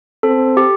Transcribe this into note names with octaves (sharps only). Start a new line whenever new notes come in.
C4 A4
G4